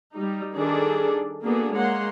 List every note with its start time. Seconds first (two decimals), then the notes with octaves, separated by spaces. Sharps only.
0.14 G3 D#4
0.56 D#3 G3 D4 G#4 A4 D5
1.44 A#3 B3 D4 F#4 G#4 A4
1.73 G#3 A#3 C#5 F#5 C6